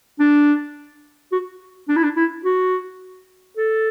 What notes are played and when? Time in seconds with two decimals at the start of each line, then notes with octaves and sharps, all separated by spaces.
0.20 D4
1.32 F#4
1.89 D4
1.96 E4
2.03 D4
2.16 E4
2.45 F#4
3.57 A4